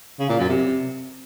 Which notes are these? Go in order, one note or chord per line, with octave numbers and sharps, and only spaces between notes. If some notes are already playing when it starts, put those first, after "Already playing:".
C#3
A#2
F#2
C3